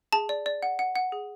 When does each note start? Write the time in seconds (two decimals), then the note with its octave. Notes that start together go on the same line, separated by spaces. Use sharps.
0.13 G#4 A5
0.29 D5
0.46 D5
0.63 F#5
0.79 F#5
0.96 F#5
1.12 G#4